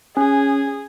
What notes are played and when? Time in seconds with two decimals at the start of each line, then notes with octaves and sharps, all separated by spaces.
0.17 C#4 G#4